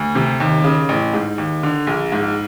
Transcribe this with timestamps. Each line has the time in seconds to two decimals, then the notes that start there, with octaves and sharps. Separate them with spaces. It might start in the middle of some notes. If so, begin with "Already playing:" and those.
Already playing: D2
0.15 C3
0.40 D#2
0.64 C#3
0.89 A1
1.13 G#2
1.38 D#2
1.63 D3
1.87 A#1
2.12 G#2